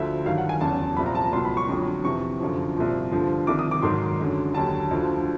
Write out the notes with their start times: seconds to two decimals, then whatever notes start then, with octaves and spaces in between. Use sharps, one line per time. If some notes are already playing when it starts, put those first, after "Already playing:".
Already playing: D2 D3 F3 E5
0.25 G2 D#3 F#3 F5
0.38 F#5
0.49 G#5
0.61 E2 C#3 F#3 A5
0.97 C2 A#2 F3 B5
1.06 A#5
1.15 A5
1.24 A#5
1.32 C#2 B2 F#3 C6
1.45 B5
1.57 C#6
1.68 F2 D3 F#3
2.04 F2 C3 E3 C#6
2.40 F#2 D3 F3
2.76 C2 A#2 F3
3.11 G2 D3 F3
3.47 C2 C3 D#3 D6
3.59 D#6
3.71 D6
3.82 G#2 D#3 F#3 C6
4.19 F#2 D3 F#3
4.54 D#2 D3 F#3 A5
4.91 D2 D3 F3